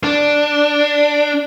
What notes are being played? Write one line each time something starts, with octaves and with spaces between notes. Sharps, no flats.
D4